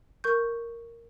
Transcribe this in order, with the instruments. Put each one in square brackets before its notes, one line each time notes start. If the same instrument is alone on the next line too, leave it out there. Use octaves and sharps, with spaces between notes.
[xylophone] A#4 C#6 G6